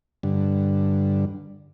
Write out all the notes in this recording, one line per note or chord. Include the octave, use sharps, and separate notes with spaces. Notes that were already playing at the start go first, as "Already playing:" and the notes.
G2 D3